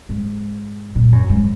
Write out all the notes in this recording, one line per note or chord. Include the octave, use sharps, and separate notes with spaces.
G#2
A#2
F#2
G#2